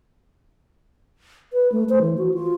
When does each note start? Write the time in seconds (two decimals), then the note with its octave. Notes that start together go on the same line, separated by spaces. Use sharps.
1.53 B4
1.72 A3
1.89 C5
2.02 E3
2.18 F#4
2.34 F4